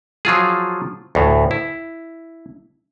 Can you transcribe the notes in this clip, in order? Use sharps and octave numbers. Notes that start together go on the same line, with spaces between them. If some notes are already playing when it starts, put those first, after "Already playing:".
F3 F#3 F4 G#4
D2 A2
E4